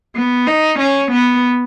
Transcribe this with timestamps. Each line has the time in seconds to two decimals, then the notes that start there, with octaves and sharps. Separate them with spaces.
0.15 B3
0.47 D#4
0.79 C#4
1.12 B3